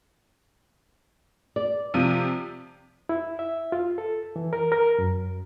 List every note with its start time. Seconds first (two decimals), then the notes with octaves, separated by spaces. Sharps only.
1.56 D5
1.94 C3 F3 D#7
3.09 E4
3.39 E5
3.72 F4
3.98 A4
4.36 E3
4.53 A#4
4.72 A#4
4.98 F#2